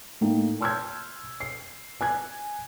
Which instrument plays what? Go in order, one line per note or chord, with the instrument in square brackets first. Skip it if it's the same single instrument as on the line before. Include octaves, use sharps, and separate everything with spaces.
[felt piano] A2 A#3 D#4 G5
A5 C6 E6 F6 G6 G#6
C7
G#5 F#6 G#6